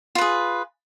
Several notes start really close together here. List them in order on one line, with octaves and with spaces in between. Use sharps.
F4 B4 G#4